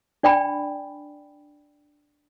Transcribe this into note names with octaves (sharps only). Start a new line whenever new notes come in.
D4 D5 G5 G#5 B5